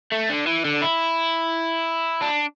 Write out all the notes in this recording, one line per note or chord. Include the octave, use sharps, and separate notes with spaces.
A3
D3
E3
D3
E4
D4